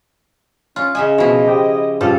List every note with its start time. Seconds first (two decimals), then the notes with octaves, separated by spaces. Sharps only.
0.76 C#4 F4
0.95 C#3 D#5 E5 G#5
1.18 B2 F3 E4
1.47 G4 C5 G5
2.01 G2 G3 C#4 F4 A4